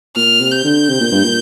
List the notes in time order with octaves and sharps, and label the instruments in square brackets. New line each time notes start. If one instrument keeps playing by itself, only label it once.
[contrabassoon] A#2 [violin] F6
[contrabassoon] C3
[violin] G6
[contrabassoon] D3
C3
A#2
G2
A#2